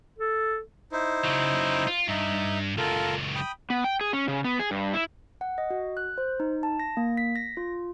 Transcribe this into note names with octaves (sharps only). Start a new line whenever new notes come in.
A4
D#4 E4 C5
C#3 F#3
F4
G2 D#4 E5
C#2 F#2 F4 A4 A#4
G5 B5 D#6
B3
G5
G#4
C#4
C#3
B3
G#4
G2
E4
F#5
D#5
F#4
F#6
C5
D#4
A5
A#6
A#3
B6
A#6
F4